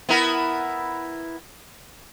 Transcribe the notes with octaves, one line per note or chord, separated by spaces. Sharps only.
B3 E4 A#4